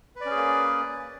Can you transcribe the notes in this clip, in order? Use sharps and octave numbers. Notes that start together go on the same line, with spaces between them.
A#3 C#4 G#4 B4 D5